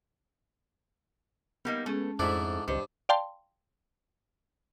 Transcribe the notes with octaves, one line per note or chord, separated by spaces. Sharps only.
G3 A#3 B3 D#4
G#3 A3 C#4 G#4
F2 G#2 A3 D4 E4 C5
C#2 G2 D#3 C5
D5 F5 G5 A5 C6